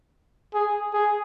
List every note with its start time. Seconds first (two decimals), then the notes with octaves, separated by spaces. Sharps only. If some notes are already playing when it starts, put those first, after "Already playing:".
0.54 G#4
0.93 G#4